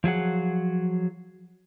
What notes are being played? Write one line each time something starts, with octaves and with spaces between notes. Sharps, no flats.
F3 F#3 G#4 F#5